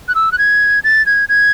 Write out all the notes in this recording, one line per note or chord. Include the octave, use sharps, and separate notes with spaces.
F#6
E6
F#6
G#6
A6
G#6
G#6